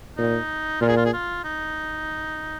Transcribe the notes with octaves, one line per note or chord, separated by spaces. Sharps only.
A#2 D#4
A#2 F4
G#4
F4
G#4
F4
D#4